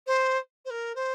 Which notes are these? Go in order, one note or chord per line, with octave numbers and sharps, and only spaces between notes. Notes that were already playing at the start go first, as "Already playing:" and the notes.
C5
C5
A#4
C5